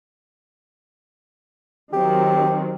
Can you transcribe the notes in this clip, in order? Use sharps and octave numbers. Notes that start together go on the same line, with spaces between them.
D#3 F#3 C4 G4